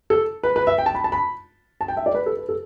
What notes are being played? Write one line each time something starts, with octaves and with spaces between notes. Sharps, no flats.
A4
B4
B4
E5
G5
A5
B5
A5
B5
A5
G5
E5
D5
B4
A4
B4
A4